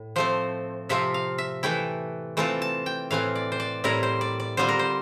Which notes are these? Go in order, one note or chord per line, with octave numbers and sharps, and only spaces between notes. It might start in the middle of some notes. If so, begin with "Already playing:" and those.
Already playing: A2
F3 A3 C4 C5
C3 F3 C4 F4 E5
F5
E5
E3 A3 E4 G5
E3 A3 C4 F4 A5
A5
G5
A2 E3 A3 C4 F5
D5
C5
D5
A2 G3 C4 E4 A#4
C5
D5
D5
D3 G3 C4 F4 C5
A#4
C5